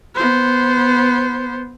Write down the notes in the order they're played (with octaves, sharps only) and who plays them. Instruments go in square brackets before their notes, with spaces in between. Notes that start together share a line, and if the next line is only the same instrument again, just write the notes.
[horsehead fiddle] B3 C5